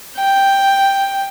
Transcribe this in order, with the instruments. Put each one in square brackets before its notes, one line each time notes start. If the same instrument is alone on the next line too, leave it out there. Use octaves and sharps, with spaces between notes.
[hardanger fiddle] G5